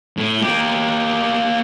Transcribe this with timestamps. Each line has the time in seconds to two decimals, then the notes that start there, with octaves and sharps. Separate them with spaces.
0.17 A2
0.42 A#3 G4